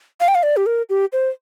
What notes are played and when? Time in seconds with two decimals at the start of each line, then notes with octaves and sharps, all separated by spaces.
0.21 F5
0.28 G5
0.35 F5
0.43 D5
0.57 G4
0.66 A#4
0.89 G4
1.13 C5